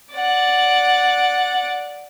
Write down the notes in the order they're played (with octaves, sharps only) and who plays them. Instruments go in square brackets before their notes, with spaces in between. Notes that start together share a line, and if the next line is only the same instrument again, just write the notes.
[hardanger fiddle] D5 F#5